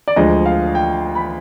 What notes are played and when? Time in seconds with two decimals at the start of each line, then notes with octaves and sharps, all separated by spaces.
0.08 D5
0.16 D2 D3 F3 G#3 D#5
0.46 F5
0.75 G5
1.15 B5